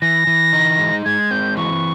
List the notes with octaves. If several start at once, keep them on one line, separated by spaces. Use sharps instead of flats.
E3 A#6
E3
D#4
G#3
G#3 G#6
C4 G6
E3 C#6